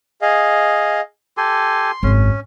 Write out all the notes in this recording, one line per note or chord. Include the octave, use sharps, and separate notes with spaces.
G#4 D#5 F5
G4 A4 G#5 C6
G#1 F#2 C#4